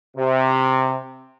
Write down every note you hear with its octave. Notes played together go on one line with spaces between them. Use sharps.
C3